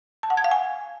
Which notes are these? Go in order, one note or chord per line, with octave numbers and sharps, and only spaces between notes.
A5
F#5
G#6
F5
G#5